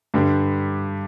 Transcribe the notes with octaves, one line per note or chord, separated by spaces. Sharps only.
G2 D3 G3 D4